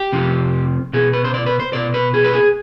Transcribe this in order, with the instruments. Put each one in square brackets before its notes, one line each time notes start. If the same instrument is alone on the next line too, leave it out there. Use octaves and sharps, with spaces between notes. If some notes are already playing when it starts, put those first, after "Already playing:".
Already playing: [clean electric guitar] G4
F2 C3 F3
B2 G#4
B4
C5
D5
B4
C5
B2 D5
B4
G#4
B4
G#4